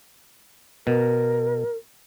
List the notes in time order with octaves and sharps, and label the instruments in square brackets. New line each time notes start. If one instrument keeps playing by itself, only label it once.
[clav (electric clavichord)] B2 [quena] A#4